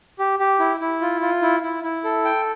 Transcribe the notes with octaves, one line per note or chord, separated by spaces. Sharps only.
G4
G4
E4
E4
F4
F4
E4
E4
E4
A4
G5